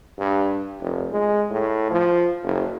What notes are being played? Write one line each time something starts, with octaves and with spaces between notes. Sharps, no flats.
G2
F1
G#3
A2
F3
F#1